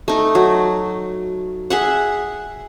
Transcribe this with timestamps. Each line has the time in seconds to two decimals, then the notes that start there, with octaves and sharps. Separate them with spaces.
0.08 A3 D#4
0.35 F#3
1.70 G#4 E5 F#5